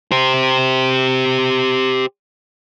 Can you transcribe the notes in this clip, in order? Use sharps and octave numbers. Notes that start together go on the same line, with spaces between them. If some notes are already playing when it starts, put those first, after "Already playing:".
G4 C5